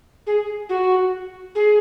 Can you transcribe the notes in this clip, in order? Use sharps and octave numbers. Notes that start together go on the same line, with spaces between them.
G#4
F#4
G#4